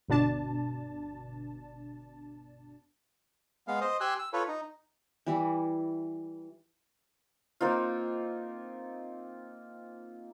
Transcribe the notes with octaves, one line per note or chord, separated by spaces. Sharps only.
G1 B2 D4 A5
G#3 B3 F5
C5 D#5
G4 G#5 C6 E6 F#6
E6
F4 A4 B4 C#5
D#4
E3 G3 E4
A#3 C4 D#4 F4